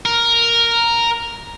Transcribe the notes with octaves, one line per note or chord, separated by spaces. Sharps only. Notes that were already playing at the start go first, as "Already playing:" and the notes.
A#4